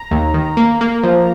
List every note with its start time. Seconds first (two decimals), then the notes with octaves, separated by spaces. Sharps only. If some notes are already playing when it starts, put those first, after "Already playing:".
Already playing: A#5
0.11 D#2
0.34 D#3
0.57 A#3
0.81 A#3
1.03 F3